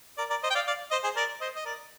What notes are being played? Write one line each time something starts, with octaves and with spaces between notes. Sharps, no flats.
A#4 D5
A#4 D5
C5 D#5
G5
D5 F5
D5 F5
C5 D#5
G#4 C5
A#4 D5
C5 D#5
D#5
A#4 D5